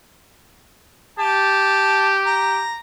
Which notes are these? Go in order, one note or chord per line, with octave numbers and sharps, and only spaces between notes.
G4 A5
A#5